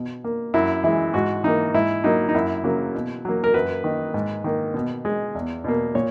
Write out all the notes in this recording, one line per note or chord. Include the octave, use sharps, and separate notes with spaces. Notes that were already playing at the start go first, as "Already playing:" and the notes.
Already playing: B2
A#3
F#2 E4
E3 G#3 E4
G#2 F#4
E3 A#3 D#4
G#2 E4
F#3 A#3 D#4
D#4
F#2 E4
C#3 F#3 A#3
B2
F#3 A#3
A#4
F#2 B4
D#3 A#3
G#2
D#3 A#3
B2
G#3
E2
B2 A#3
A#2 C#5